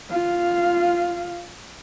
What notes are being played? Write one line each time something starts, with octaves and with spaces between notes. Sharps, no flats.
F4 F5